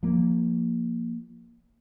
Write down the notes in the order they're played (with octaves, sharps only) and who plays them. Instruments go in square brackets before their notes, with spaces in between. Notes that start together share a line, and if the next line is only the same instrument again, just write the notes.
[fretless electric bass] F3 A#3